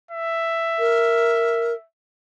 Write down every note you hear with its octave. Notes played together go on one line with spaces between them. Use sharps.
E5
A#4